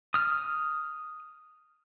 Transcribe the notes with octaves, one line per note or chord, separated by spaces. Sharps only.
D#6 F6